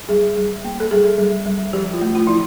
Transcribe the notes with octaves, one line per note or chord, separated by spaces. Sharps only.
G3 G#4
G3
A#3
A4
G3 G#4
G3
G3
F3 G4
F4
A3
F4
F3 E4